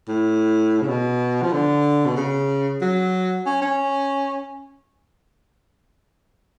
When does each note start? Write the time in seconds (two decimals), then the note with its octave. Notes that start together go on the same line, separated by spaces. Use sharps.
0.08 A2
0.82 C#3
0.88 B2
1.42 F3
1.53 D3
2.06 B2
2.16 C#3
2.81 F#3
3.46 C#4
3.62 C#4